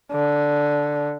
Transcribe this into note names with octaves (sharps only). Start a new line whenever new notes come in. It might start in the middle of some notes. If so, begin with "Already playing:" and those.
D3